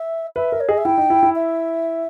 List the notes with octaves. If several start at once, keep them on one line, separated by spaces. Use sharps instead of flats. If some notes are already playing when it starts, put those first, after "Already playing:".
Already playing: E5
B4 E5
A#4
C#5
G#4 D#5
E5
E4 G5
D#4
E4
E4
E5